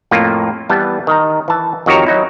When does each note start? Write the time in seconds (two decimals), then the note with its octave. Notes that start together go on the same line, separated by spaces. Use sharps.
0.11 F2 A2 A#3 F4
0.69 E3 G3 B3 A5
1.07 D#3 A#5
1.48 E3 A5
1.86 F2 D#3 F#4 G4 C#5 A#5
2.06 F#3 D#4 E4